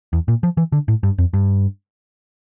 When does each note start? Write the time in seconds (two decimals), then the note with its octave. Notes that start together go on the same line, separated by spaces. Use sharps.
0.13 E2
0.28 A#2
0.43 F3
0.57 E3
0.72 D3
0.88 A2
1.03 G2
1.18 F2
1.33 G2